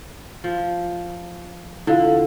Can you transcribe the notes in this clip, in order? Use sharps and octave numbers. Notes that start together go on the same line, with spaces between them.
F3
D3 E4 F4 F5